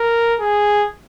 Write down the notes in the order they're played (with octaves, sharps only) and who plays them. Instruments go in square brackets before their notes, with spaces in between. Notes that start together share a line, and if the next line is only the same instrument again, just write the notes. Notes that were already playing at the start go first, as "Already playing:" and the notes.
Already playing: [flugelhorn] A#4
G#4